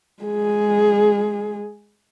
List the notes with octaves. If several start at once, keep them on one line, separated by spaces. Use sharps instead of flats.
G#3 G#4